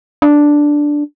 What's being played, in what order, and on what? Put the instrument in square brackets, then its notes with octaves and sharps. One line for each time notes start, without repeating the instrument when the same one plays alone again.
[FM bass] D4